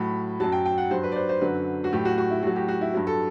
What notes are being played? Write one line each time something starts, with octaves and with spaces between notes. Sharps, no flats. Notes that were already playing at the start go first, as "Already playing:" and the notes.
Already playing: A2 F#3 B5
F#2 F#3 A5
G5
G5
F#5
G2 F#3 C5
B4
D5
C5
C5
F#2 D3 F#3 B4
F#4
A2 F#3 G4
F#4
F#4
E4
A2 F#3 F#4
G4
F#4
E4
G2 F#3
A4